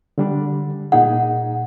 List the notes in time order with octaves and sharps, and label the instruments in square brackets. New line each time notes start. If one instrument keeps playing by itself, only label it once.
[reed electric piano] D3 G3 D4
[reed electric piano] A#2 D#4 G#4 [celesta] F#5